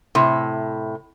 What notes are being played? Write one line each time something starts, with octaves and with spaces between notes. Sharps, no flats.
A2 C3